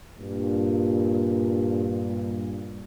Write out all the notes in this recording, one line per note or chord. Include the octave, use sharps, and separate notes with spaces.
G2 A#2